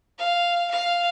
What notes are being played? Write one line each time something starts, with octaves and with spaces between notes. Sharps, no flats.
F5
F5